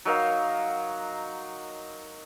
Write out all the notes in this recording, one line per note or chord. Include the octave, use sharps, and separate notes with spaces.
F#3 D#4 A#4 F5